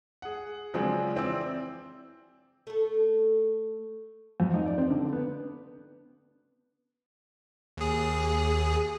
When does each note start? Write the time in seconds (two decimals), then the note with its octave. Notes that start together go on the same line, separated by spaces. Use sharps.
0.22 G#4 F#5
0.74 C#3 F3 F#3 G#3 C4 D4
1.15 E3 C4 D5 E6
2.67 A3 A4
4.40 F2
4.54 D#4
4.66 D5
4.78 C4
4.90 D3
5.13 B3
7.77 D#2 G#4